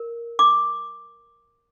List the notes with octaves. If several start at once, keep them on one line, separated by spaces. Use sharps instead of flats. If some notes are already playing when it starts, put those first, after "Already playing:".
Already playing: A#4
D6